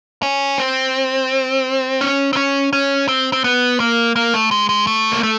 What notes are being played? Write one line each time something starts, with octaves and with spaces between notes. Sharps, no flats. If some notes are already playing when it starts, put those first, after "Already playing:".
C#4
C4
C#4
C4
C#4
C#4
C4
C4
B3
A#3
A#3
A3
G#3
G#3
A3
A#3
A3